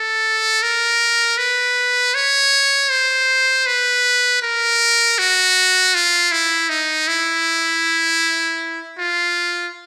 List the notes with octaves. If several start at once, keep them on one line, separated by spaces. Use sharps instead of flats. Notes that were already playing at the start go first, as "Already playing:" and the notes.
Already playing: A4
A#4
B4
C#5
C5
B4
A#4
F#4
F4
E4
D#4
E4
F4